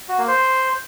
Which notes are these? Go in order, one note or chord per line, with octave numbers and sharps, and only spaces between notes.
F#4
A#3
C5